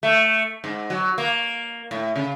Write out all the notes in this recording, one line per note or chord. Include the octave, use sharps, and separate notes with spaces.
A3
G#2
F#3
A#3
A2
C#3